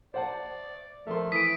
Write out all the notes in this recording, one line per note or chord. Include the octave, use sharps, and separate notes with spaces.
C5 D5 F#5 A5
F3 A3 A#4 C6
E3 D#6 B6 D7